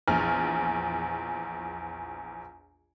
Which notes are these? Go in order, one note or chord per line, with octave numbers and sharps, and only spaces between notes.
A#1 E2 G#5 F6